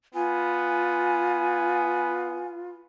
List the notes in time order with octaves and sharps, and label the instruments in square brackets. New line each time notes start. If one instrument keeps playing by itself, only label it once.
[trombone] B3 [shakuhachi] F4 [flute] G#5